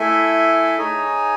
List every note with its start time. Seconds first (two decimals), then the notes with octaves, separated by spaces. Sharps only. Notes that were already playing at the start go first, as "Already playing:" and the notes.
Already playing: A3 E4 A4 E5 G#5
0.78 D#4 G#4 C#5 G#5